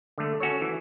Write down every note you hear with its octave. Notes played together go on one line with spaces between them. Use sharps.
D3 A3
C#4 F#4 A4 C#5
E3